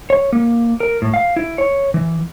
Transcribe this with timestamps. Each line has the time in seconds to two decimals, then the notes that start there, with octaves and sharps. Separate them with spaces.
0.10 C#5
0.33 A#3
0.80 A#4
1.02 A2
1.14 F5
1.36 E4
1.58 C#5
1.94 E3